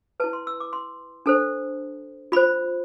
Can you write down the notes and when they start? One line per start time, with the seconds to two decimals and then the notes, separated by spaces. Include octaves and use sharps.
0.20 E4 B4 A5
0.33 C6
0.47 E6
0.60 D6
0.73 C6
1.26 D4 A4 C5 A5
2.32 F4 C5 B5